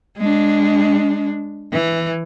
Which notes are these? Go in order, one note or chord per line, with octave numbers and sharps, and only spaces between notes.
G#3 D4
E3